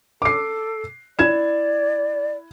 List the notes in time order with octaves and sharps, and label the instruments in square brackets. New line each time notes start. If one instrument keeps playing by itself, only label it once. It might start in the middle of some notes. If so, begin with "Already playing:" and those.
[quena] A4 [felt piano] D6 C7
[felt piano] E4 G#6 E7 [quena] D5